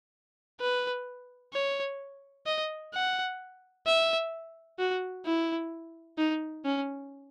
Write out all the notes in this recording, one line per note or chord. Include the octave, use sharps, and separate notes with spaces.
B4
C#5
D#5
F#5
E5
F#4
E4
D#4
C#4